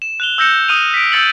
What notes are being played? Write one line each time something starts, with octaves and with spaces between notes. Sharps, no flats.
E7
F#6 F7 G7
E6 G6 A#6 C#7 E7
D#6 F6 D#7 F7
B6 D7
E6 G6 A6 C#7 F#7